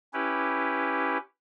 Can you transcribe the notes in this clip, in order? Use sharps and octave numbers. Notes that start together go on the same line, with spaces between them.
C#4 E4 G4 B4